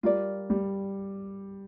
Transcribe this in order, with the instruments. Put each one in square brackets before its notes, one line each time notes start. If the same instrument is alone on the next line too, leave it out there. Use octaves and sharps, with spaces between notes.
[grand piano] G3 [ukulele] F4 A#4 D5
[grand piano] G3